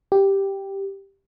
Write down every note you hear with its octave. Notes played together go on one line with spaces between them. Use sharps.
G4